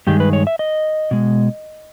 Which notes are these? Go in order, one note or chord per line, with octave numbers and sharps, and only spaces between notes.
G2 D#3 G#3 G4
B4
C#5
E5
D#5
B2 G#3